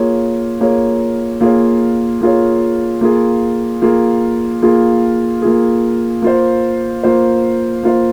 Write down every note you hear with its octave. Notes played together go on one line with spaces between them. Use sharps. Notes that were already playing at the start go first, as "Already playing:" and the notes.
Already playing: A#3 F4 G#4 C#5
A#3 F4 G#4 C#5
A#3 F4 G#4 C#5
A#3 F4 G#4 C#5
A#3 F4 G#4
A#3 F4 G#4
A#3 F4 G#4
A#3 F4 G#4
A#3 F4 C5
A#3 F4 C5
A#3 F4 C5